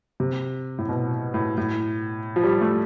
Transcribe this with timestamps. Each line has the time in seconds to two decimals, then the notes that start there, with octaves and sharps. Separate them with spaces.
0.20 C3
0.78 A2
0.89 B2
1.34 A2
1.58 A2
2.36 F3
2.44 G3
2.61 A3